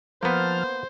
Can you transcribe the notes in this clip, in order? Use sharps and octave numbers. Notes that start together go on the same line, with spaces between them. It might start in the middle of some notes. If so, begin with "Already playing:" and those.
F3 A#3 B3 C5 A5 F6